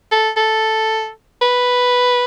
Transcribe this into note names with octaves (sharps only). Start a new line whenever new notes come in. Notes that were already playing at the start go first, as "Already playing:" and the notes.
A4
A4
B4